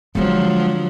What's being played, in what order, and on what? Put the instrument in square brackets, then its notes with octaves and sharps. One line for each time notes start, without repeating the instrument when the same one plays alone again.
[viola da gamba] D3 F3 F#3 [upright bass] G#3 C4